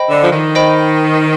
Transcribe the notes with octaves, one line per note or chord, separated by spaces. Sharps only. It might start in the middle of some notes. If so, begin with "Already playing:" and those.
Already playing: C5 D#5 G5 B5
D3
F3
D#3
C5 D#5 G5 B5